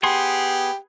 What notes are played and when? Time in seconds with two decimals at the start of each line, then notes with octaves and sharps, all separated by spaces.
0.03 B3 G4 G#4 C6